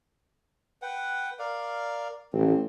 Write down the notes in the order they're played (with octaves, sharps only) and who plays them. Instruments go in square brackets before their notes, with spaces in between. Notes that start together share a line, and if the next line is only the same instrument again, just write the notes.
[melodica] B4 F#5 G5
A#4 D5 F5
[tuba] A1 [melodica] C4